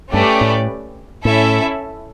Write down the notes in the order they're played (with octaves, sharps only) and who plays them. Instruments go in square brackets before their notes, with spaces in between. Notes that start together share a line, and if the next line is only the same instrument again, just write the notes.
[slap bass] G2 [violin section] A3 C#4 G4 B4 D5
[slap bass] A2
[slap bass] A2 [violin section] C#4 E4 A4 E5